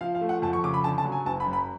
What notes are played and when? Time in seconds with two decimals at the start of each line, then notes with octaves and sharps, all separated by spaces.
0.01 F3 F5
0.15 F5
0.21 A3
0.29 F#5
0.42 F2 A5
0.53 C#6
0.64 C#3 D6
0.74 B5
0.84 D3 A5
0.98 A5
1.05 F#3
1.12 G#5
1.26 F#1 A5
1.40 B5
1.46 F#2
1.53 B5